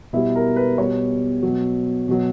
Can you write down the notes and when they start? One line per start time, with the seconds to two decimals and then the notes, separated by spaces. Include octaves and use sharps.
0.13 B2 G3 E4
0.35 A#4
0.56 B4
0.78 B2 G3 C#5
1.43 B2 F#3
2.08 B2 F#3